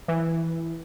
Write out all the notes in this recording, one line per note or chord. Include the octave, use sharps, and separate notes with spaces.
E3